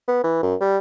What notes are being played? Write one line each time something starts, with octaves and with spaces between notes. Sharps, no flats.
B3
E3
F#2
G3